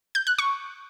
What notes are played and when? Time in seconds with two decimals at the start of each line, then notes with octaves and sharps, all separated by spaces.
0.15 G6
0.27 F#6
0.39 C#6